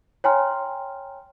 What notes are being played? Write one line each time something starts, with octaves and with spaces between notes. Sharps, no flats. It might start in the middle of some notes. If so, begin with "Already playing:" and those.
C#5 G5 G#5 A#5 C6 F6